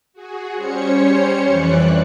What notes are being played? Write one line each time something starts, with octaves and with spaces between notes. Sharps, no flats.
F#4 G#4
G3 C#4 C5 C#5 C#7
F2 E3 D5 F#6